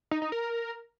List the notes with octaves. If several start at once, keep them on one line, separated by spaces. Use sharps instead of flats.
D#4
D#4
A#4